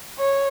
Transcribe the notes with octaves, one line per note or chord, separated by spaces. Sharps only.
C#5